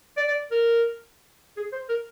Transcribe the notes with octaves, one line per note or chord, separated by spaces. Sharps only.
D5
D5
A#4
G#4
C5
A#4